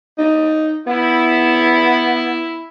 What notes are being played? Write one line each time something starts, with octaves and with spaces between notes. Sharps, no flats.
D#4
B3 E4